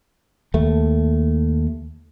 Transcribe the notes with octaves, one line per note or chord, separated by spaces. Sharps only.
D#2 A3